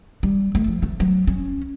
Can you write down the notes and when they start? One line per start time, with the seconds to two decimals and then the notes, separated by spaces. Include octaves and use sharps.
0.23 G3
0.55 A3
0.68 F3
0.83 A3
1.00 F#3
1.28 C#4